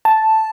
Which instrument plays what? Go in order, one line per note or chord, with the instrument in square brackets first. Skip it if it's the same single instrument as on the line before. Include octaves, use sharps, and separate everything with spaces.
[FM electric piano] A5